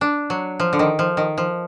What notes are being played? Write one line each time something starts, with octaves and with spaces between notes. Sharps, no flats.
D4
F#3
F3
D3
D#3
F3
D#3
F3